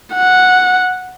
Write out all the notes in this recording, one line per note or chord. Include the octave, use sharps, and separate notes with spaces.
F#5